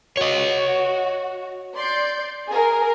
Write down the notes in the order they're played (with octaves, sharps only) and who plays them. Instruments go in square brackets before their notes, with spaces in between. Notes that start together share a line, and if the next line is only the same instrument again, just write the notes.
[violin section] F#4 [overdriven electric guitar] C#5 D#5
[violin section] D5 C6 G6
G#4 A#4